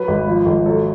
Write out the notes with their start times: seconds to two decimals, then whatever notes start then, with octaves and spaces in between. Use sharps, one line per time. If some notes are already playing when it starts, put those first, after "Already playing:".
Already playing: F#3 B4
0.08 G#1
0.27 F3
0.46 G#1
0.66 F#3 A4